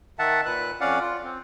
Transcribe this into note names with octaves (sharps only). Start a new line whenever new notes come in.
D#3 E5 F#5 A5
A#2 B4 F#6
F2 C#4 D5 F5 F#5
F4
C4